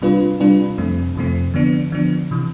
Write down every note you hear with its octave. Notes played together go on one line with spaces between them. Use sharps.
C3 G3 D4 F4 B4
C3 G3 D4 F4 B4
F2 C3 F3 A3 C4
F2 C3 F3 A3 C4
D3 F3 B3 D4
D3 F3 B3 D4
C3 E3